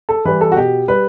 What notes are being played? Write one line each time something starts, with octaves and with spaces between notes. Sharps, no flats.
A4
E3 G3 B4
A4
F#4
B2 G4
G3 B4